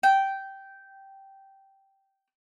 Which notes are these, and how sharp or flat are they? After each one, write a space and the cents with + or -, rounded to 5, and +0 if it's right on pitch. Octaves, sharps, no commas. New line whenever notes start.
G5 -10